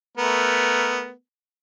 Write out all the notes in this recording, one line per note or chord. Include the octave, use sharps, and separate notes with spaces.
A3 B3 A#4